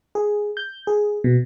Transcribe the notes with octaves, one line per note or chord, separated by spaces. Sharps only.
G#4
G6
G#4
B2